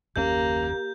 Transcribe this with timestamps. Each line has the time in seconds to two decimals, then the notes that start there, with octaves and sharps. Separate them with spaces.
0.16 F#1 D#2 A#3 C#4 G4 G6